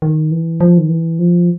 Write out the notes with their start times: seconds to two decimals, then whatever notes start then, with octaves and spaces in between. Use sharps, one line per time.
0.02 D#3
0.31 E3
0.61 F3
0.78 D#3
0.89 E3
1.19 F3